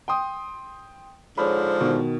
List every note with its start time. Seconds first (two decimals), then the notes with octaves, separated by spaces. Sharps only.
0.08 G5 C6 D#6
1.38 G#2 D3 F3 G#4 C#5 B5
1.81 B2 D#3